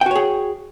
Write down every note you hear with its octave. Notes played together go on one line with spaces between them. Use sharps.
F#4 G#4 C#5 G5